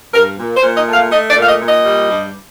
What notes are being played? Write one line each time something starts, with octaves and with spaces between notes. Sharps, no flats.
G2 A#4
A#2
C5
A#2
D#5
A3
F5
A3 D#5
D5
A#2
F5
D#5
A#2
D#5
G3
G2